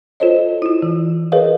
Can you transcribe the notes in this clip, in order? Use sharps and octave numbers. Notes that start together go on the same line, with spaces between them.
F4 A4 C5 C#5 D#5
E4 F4
E3
G#4 A#4 B4 C#5 D#5 F5